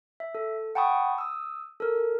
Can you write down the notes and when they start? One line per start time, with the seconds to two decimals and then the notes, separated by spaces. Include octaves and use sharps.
0.20 E5
0.35 A4
0.75 F#5 G5 A5 B5 C#6 D#6
1.18 D#6 E6
1.80 A4 A#4